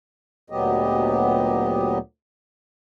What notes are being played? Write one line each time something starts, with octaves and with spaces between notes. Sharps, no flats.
D2 A#2 F#3 B3 G4 D#5